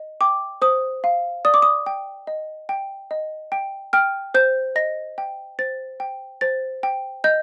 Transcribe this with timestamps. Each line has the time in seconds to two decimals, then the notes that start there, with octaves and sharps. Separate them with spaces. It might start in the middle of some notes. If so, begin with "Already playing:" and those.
Already playing: D#5
0.21 G5 D6
0.62 C5 D#6
1.04 F5
1.45 D5 D#6
1.54 D6
1.62 D#6
1.86 G5
2.27 D#5
2.69 G5
3.11 D#5
3.52 G5
3.93 G5 F6
4.34 C5 G6
4.76 D#5 A#6
5.18 G5
5.59 C5 A6
6.00 G5
6.41 C5 A6
6.83 G5
7.24 D#5 G6